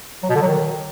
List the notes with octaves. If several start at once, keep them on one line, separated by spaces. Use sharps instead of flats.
F#3
B2
D3
F#3
D#3